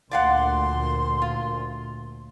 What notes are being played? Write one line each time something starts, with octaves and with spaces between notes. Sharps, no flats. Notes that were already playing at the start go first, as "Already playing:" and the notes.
D2 A#2 D5 F5 F#5 C6
F4